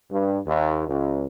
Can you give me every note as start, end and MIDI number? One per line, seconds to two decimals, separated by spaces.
0.11 0.38 43
0.45 0.85 39
0.86 1.26 37